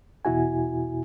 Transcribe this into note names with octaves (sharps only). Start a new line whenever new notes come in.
E2 B2 E4 F#4 G#5